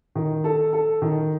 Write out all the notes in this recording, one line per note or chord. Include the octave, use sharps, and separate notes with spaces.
D#3
A4
A4
D#3